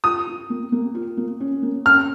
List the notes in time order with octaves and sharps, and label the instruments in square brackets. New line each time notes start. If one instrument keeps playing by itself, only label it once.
[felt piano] F4 [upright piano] D#6
[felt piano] F4
A#3
A#3
F4
A#3
C#4
A#3
[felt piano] C#4 [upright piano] F6